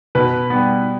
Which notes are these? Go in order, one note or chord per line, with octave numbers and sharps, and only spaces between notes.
B2 B4
G3 B3